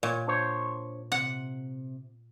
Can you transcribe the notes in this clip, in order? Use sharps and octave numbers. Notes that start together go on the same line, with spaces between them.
A#2 C#5
D4 C5 C#5
C3 F#5